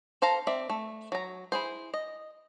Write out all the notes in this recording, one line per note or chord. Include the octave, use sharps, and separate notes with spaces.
A4 C5 F5 A5 A#5
C4 D5 E5
A3
F#3 A#5
E4 G#4 C5
D#5